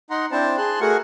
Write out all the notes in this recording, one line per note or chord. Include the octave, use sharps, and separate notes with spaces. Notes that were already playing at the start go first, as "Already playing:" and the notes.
D#4 F#5 A#5 C6
C4 D4 E4 C5 A5
G#4 A5 C6 F#6
A3 F#4 G#4 A#4 F#5 C#6